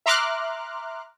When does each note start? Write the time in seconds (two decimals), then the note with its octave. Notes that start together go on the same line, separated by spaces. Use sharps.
0.06 E5 A#5 C6 D6 F6 F#6